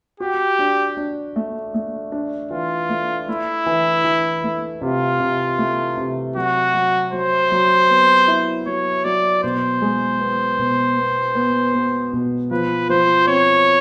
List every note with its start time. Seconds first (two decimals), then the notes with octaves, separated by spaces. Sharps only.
0.20 F#4 G4
0.59 D4
0.97 D4
1.36 A3
1.74 A3
2.12 D4
2.51 E3 F4
2.89 A3
3.28 A3 E4
3.66 E3
4.04 E3
4.43 A3
4.81 C3 F4
5.20 C3
5.58 A3
5.97 C3
6.35 F#3 F#4
6.74 F#3
7.13 F#3 C5
7.51 F#3
7.89 B3
8.28 E4
8.66 F#3 C#5
9.04 F#3 D5
9.43 B2 C5
9.82 G#3
10.20 B3
10.59 B2
10.97 B3
11.35 B3
11.74 B3
12.13 B2
12.51 F3 B4
12.90 F3 C5
13.28 C4 C#5